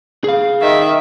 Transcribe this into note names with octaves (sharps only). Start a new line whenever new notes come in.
G#4 F5
D#3 E5